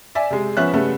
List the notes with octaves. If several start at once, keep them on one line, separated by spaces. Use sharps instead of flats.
D5 E5 G#5
C3 G#3
F3 B3 C#4 E5 F#6
C#3 G3 A3 B3